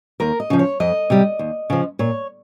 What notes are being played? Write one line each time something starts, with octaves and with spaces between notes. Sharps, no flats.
D#2 A#4
D#5
C#3 F3
C#5
F2 D#5
C3 G3
D#2
C#3 F3
A#2 C#5